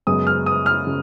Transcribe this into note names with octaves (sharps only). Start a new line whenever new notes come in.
F#2 C#3 G#3 B3 D#6
F6
D#6
F6
C#3